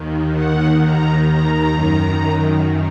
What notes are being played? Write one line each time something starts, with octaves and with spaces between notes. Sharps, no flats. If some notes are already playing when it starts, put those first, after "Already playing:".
Already playing: D#2 D#3
F#5
A#5
A#5
F#2 D#3